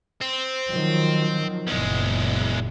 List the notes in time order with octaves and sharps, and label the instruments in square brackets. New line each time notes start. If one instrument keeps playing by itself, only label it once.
[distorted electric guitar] C4
[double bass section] D#3 F3 F#3
[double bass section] F#1 A#2 [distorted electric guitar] E2 G#3